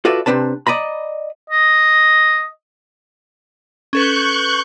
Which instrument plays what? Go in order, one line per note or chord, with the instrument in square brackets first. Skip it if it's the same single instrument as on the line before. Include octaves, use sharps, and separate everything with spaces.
[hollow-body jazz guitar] F4 F#4 A4 B4 D5 E5
C3 C4 D4 B4 A5
D5 D#5 A#5 B5
[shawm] D#5
[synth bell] C#4 A4 B4 [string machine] C#6 F#6 G6